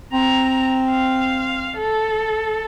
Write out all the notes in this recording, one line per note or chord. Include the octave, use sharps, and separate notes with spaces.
C4 A#5
F5
A4